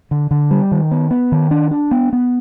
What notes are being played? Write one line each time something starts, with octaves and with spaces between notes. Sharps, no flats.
D3
D3
G3
D#3
B3
B3
D#3
D4
D4
B3
B3